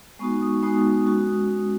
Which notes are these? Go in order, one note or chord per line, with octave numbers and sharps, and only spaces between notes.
G#3 B3 D#4 F#4 C#6
D#6
G#3 B3 D#4 F#4 D#6
G#3 C#4 F#4